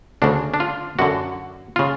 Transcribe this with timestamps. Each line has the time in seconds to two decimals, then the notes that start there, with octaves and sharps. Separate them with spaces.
0.22 D2 C#3 D4
0.54 D4
0.60 F4
0.99 F#2 D3 F#4
1.76 C#3 F4